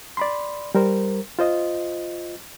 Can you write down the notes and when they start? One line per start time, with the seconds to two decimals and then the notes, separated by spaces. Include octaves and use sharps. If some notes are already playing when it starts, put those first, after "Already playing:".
0.17 D5 B5 C6
0.75 G3 A#4 C5
1.39 F4 C5 D#5